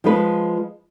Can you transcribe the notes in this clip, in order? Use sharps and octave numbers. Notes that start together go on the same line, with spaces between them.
F3 G#3 B4